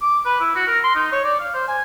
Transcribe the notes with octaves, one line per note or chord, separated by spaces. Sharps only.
D6
B4
E4
F#4
A#4
C6
D#4
C#5
D5
F5
C5
G#5